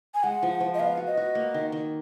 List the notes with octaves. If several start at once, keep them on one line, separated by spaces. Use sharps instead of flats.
G#5
G#3 F#5
F3
F3
D#5
B3 F5
F#4
D#5
F#4
A#3
D#3
D#3